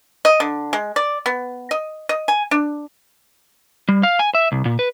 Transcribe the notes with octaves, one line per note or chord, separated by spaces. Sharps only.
D#5
D3
G#3
D5
B3
D#5
D#5
G#5
D4
G3
F5
G#5
E5
C2
A#2
B4